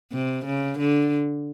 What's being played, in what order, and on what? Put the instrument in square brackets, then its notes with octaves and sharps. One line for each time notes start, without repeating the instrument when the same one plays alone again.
[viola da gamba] C3
C#3
D3